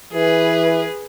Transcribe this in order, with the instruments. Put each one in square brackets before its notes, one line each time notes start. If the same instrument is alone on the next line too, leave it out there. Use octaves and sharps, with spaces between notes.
[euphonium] E3 [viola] G#4 B4